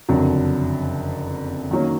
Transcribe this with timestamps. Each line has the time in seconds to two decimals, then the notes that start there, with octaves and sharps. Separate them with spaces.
0.09 F#1 F2 D3 F#3
1.71 D#3 F#3 A#3 C#4